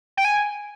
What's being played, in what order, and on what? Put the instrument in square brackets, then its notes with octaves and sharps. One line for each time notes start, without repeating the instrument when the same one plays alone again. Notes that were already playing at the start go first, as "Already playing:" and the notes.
[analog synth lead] G5
G#5